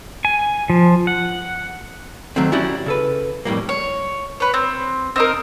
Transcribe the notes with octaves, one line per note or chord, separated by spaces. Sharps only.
G#5
F3
F#5
D#3 F#3 A3 C4
C#4 E4 F#4 G4 D5
C#3 A4 B4
F2 A2 G3 A#3
C#5
B4 C#5
C4
C4 D#4 A#4